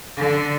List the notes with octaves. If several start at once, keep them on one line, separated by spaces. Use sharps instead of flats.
D3